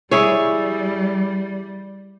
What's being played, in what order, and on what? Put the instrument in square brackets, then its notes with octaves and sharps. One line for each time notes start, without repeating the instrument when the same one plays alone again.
[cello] G3 [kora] E4 G#4 C#5